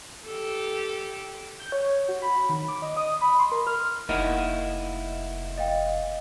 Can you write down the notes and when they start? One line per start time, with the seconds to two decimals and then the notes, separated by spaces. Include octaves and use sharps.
0.24 G4 A4
1.60 G6
1.72 C#5
2.08 F#4
2.22 B5
2.49 D#3
2.68 D6
2.82 D#5
2.97 D#6
3.21 B5
3.39 C6
3.52 A#4
3.67 F6
4.09 F1 A#3 D#4 E4 D#5 F#5
5.58 D#5 F5 G5